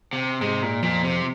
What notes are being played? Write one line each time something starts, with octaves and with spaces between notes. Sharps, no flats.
C3
G#2 C3 G#3
A#2
F2 A#2 F3
C3